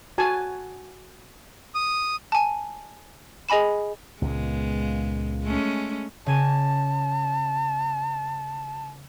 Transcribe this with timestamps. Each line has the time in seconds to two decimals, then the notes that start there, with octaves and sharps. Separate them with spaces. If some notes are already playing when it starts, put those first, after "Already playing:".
0.18 F#4 G#5 A5
1.75 D#6
2.32 G#5 A5
3.49 G#4 D#5 G#5 B5 E7
4.22 C#2 A#2 G#3 B3
5.44 G#3 A3 C#4
6.26 C#3 G#5 A5 D#7